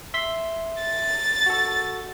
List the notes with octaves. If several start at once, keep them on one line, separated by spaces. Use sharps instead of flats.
E5 C6 B6
A6
F#4 A4